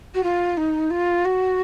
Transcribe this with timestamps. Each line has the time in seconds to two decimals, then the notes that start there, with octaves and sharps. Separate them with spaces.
0.14 F#4
0.23 F4
0.57 D#4
0.90 F4
1.25 F#4